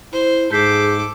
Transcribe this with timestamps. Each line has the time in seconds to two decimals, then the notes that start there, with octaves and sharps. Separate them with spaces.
0.12 E4 C5
0.52 G#2 G#4 A4 D6 G6 B6 C7